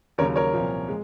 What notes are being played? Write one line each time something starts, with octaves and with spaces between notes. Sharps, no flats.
D#2 C#3 F#3 A#4 C#5
A#4 C#5
C2 A#2 F3
G#3